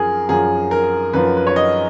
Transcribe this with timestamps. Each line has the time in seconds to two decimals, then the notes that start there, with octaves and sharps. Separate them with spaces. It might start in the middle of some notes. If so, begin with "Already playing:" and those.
Already playing: F#2 F3 G#4 A#4
0.29 F#2 F3 G#4
0.71 A#4
1.13 F#2 F3 B4
1.37 B4
1.47 C#5
1.56 D#5